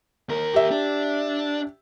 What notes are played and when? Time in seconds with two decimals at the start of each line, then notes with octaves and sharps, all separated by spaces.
0.29 D#2 A#4
0.54 G4 E5
0.71 D4